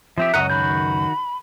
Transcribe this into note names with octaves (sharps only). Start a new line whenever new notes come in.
F3 C4 G4 E5
C#2 F#2 F#4 D#5 F#5 A#5
D#3 F#4 B5 G6